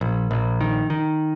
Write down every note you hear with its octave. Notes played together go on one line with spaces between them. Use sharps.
A#1
A#1
D#3
D#3